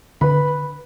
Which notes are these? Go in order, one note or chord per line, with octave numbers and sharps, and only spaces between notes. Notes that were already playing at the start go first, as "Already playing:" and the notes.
D3 B4 B5